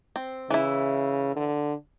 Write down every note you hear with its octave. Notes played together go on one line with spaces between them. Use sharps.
C4
C#3 E3 E4
D3